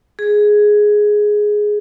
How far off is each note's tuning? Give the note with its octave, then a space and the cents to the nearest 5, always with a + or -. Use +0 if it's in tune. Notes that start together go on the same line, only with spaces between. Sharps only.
G#4 +5